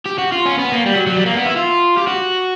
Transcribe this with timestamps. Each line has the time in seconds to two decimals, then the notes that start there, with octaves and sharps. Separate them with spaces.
0.06 G4
0.18 F#4
0.32 F4
0.46 C#4
0.59 B3
0.73 A#3
0.86 G3
0.96 F#3
1.07 F#3
1.17 G3
1.26 A#3
1.36 B3
1.46 E4
1.56 F4
1.98 G4
2.07 F#4